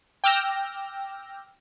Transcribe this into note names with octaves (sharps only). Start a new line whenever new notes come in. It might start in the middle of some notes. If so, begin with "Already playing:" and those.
G5 D6 E6 F6 G6 A#6